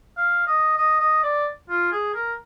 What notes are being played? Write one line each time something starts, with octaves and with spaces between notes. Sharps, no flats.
F5
D#5
D#5
D#5
D5
F4
G#4
A#4